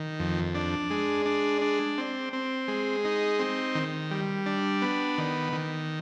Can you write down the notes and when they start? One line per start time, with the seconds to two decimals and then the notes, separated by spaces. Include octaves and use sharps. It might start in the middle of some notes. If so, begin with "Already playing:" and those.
Already playing: D#3
0.19 F2
0.55 D4
0.90 G#3
1.26 D4
1.62 D4
1.98 C4
2.33 C4
2.68 G#3
3.05 D#4
3.39 C4
3.75 D#3
4.11 G3
4.46 D4
4.82 B3
5.18 D#3
5.53 D#3